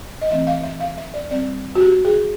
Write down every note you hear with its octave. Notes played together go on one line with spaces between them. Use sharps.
D#5
E3 A3 C4 E5
F5
E5
F5
E5
D5
G3 C4 D5
F#4
G4
G#4